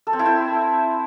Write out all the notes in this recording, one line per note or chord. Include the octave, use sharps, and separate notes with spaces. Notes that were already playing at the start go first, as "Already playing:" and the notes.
A4
C4
E4
C5